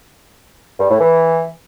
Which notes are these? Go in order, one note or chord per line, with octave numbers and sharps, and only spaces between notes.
G2
A2
E3